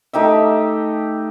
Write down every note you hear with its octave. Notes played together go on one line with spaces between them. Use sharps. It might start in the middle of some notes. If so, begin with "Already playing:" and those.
A3 D#4 G4 E5